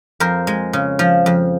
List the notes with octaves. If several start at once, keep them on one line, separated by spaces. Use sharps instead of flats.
F2 A#4 C5
G#3
C#3
F3
F2